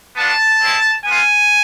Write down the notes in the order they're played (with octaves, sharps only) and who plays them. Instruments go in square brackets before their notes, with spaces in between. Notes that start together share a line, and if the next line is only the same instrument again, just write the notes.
[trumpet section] B3 D4 F4 A5
G#3 C4 E4
B3 F4 G#5